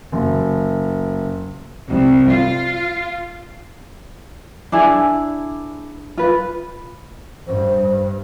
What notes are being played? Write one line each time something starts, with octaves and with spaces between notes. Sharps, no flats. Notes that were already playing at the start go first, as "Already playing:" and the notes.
F#1
C2
F4
D4 E4 G#4
F4 B4
G2 C5